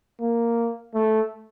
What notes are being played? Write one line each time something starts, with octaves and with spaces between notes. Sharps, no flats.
A#3
A3